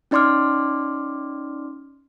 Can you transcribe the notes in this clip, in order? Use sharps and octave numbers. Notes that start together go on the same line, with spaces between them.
C#4 D#4 D5 C6 D6 F6